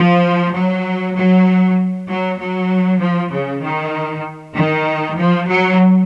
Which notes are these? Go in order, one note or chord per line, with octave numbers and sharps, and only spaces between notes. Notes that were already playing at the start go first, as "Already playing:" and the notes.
Already playing: F3
F#3
F#3
F#3
F#3
F3
C#3
D#3
D#3
F3
F#3